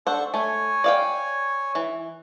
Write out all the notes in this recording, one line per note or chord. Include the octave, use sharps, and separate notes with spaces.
D4 A4 C5 F#5 C#6
A3 C#5 G#5
D5 F5 G5
E3